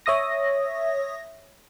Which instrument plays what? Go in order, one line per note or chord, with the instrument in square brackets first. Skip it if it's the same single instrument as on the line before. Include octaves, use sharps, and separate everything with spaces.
[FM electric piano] C#5 E5 D#6 A#6